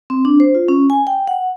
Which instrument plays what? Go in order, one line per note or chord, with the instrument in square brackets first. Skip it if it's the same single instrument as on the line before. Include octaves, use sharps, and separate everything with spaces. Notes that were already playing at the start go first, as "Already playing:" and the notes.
[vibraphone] C4
D4
C5
F4
C#4
G#5
G5
F#5